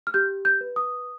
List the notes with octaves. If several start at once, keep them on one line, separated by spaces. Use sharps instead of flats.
F6
G4 G6
G6
B4
D#6